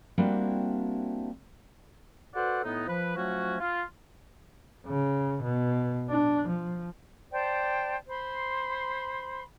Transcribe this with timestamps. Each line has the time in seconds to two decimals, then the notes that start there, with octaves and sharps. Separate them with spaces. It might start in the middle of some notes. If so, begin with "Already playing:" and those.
0.18 G3 A#3 C4 D4 E4 F#4
2.35 F#4 A4 B4 C5 D5 F#5
2.64 A2 B3 D#4
2.88 F3 B4
3.16 F3 F#3 A3 C#4 F#4
3.61 F4
4.87 C#3
5.43 B2
6.09 D4
6.49 F3
7.32 C5 D5 G5 A5
8.07 C5 B5 C6